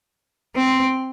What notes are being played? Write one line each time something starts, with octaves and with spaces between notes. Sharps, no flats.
C4